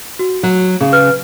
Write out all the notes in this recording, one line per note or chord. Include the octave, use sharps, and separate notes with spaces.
F#4
F#3
C#3 G#4
B4 F6